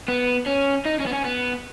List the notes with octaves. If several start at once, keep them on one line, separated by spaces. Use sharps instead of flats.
B3
C#4
D#4
C#4
B3
C#4
B3